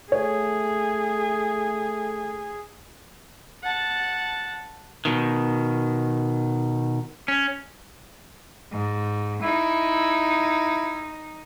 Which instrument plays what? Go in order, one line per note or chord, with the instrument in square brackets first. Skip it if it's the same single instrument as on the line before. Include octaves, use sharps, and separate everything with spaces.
[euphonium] A3 [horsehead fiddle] G#4 [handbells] C#5
[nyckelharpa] F#5 A5
[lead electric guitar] B2 D#3
C#4
[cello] G#2
[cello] D#4 [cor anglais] E4